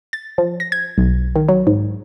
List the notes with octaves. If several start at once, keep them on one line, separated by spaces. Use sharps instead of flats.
A6
F3
A#6
G#6
B1
D#3
F#3
G#2